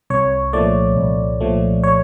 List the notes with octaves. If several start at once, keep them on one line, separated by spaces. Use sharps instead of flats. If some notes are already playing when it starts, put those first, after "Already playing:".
C2 C#5
A#2 F3 A3 D5
C2
A#2 F3 A3
C#5